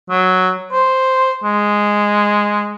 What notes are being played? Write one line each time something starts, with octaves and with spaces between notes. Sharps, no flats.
F#3
C5
G#3